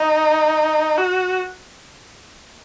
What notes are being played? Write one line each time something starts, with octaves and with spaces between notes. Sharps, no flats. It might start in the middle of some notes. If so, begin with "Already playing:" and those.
Already playing: D#4
F#4